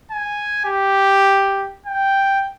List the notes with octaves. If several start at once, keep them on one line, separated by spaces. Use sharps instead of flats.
G#5
G4
G5